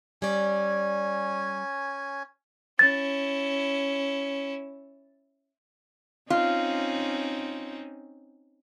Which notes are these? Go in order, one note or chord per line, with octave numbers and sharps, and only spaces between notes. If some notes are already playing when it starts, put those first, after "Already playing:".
G3 C#4 D5 G#5
C#4 E4 A6
C4 C#4 D#4 F4